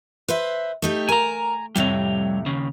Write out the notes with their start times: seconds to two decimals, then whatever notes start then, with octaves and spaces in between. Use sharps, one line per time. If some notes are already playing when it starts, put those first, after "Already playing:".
0.28 B4 C5 E5
0.82 A3 D#4 G4
1.09 A#4 G#5 A#5
1.76 F2 A2 C3 G3 C#5
2.46 D#2 C#3